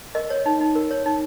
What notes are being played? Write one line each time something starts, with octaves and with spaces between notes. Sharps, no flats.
A#4 D#5
C#5
D#4
D#4
A#4
C#5
D#4